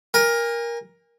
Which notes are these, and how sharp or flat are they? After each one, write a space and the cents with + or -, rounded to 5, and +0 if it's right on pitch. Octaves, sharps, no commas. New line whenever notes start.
A#4 +10 G#5 -40